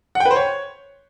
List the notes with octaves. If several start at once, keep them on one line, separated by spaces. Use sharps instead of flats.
F#5
G5
B4
C5
C#5